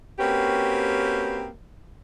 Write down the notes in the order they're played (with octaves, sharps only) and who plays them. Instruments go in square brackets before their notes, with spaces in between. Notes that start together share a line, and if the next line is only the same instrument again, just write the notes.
[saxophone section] A#3 C4 C#4 F#4 G4 B4